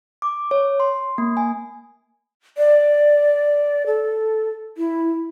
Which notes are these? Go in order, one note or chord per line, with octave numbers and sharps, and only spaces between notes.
D6
C#5
C6
A#3
G#5
D5
A4
E4